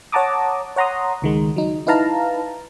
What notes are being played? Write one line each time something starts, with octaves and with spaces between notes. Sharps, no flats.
C#5 F#5 A5 A#5 D6 D#6
C#5 F#5 A#5 C6 D#6
C#2 D#3 G#3
F#3 D#4
D#4 E4 B4 F5 A5 A#5